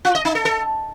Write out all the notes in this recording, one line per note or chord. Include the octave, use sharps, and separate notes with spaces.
F4
D#5
D#4
A4
A4